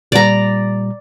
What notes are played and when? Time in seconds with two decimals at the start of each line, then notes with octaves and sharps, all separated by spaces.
0.12 A#2 G3 D5 A#5